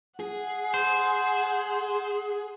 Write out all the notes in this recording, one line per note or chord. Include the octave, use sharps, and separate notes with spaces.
G#4 F#5
C5